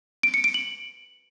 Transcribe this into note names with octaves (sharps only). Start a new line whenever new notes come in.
D7
C#7
D7
F#7